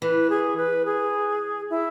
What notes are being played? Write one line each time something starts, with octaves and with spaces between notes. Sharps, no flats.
E3 B4
G#4
B4
G#4
E4